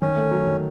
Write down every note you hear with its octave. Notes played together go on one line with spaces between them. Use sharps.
D#3 C#4
A3
F#3
D#3